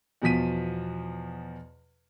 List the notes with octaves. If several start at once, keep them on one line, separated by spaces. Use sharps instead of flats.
E2 B2 F3 B6 D#7